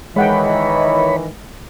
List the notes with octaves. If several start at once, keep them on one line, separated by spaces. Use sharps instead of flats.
D#3 E3 G#3 C#5 D#5 F#5 G5 B5